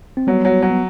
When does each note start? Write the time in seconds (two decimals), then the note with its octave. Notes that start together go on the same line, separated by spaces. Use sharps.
0.17 C4
0.27 F#3 G3 B3
0.45 F#3
0.62 F#3
0.70 B3